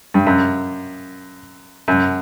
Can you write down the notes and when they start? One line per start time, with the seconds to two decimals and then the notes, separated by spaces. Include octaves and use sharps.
0.14 G2
0.27 F#2
1.88 F#2